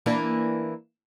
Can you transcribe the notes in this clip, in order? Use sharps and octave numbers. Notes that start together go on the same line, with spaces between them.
E3 A#3 D4